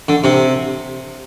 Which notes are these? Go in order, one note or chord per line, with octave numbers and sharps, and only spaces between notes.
D3
C3